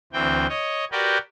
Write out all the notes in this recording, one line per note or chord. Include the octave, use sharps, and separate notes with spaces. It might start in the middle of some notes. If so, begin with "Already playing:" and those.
D2 E3 C4 G5
C#5 D#5
F#4 G4 A#4 B4 D5 G5